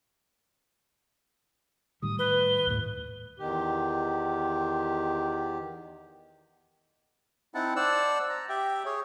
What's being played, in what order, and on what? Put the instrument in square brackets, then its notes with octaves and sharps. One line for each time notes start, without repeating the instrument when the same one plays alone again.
[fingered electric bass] A2 D#3 G3 [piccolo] D#6
[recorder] B4 [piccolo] G7
[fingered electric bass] D#2 A2
[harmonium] E2 D#3 G4
[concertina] C4 D#4 E4 F#5 A5
C5 D5 F#5 A5 E6
A#5
G4 E5 G5
G#4 C#5